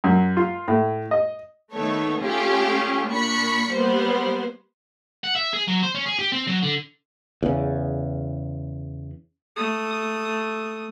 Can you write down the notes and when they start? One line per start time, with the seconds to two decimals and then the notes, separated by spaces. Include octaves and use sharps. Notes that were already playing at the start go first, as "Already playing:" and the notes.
0.04 F#2
0.37 F4
0.68 A2
1.11 D#5
1.73 D#3 A3 B3 A4 C#5
2.21 A3 C#4 F4 G4 G#4
3.08 A#2 D4 B5 C#6 C#7
3.73 G3 A#3 B3 C5
5.24 F#5
5.35 E5
5.53 G#4
5.67 F#3
5.83 C5
5.95 C#4
6.06 G#4
6.19 G4
6.32 C4
6.47 F#3
6.63 D3
7.43 E2 C#3
9.56 A3 D#6